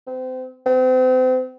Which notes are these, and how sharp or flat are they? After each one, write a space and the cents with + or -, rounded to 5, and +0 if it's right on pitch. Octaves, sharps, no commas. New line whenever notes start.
C4 -30
C4 -35